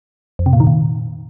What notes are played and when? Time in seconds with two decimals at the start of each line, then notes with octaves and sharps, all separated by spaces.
0.39 F2
0.46 C3
0.53 A#2
0.60 D#3
0.67 A#2